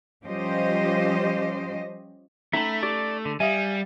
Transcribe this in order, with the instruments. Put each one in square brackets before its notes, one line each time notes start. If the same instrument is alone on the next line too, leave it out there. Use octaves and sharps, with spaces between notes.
[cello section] F3 G3 C#4 G4 C5 D#5
[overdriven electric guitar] A3 [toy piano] C#4 D#4 A#5 [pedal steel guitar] E5 B5
[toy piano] G4 [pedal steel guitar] D5
[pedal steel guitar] D3
[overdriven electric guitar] G3 [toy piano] E5 F5 D#6 [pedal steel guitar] G#5